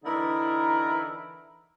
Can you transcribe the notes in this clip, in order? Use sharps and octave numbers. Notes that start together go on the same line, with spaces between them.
D3 E3 D#4 E4 A#4